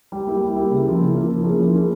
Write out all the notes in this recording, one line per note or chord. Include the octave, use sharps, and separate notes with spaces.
G3
A#3 E4 G4
G3
A#3 E4 G4
C#3
F3 A#3 E4
C#3
F3 A#3 E4
F3
A#3 C#4 E4 G#4
F3
A#3 C#4 E4 G#4